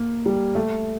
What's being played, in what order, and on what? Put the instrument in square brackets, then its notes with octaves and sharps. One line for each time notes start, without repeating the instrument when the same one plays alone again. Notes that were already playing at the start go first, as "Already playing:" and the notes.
Already playing: [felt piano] A#3
G3
A3